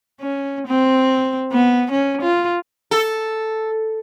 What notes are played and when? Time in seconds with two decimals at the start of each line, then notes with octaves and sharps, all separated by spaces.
0.21 C#4
0.68 C4
1.52 B3
1.92 C#4
2.22 F4
2.91 A4